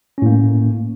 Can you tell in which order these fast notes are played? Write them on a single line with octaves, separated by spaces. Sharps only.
C#4 A2 A#3